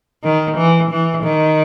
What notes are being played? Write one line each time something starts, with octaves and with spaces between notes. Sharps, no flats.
D#3
E3
E3
D#3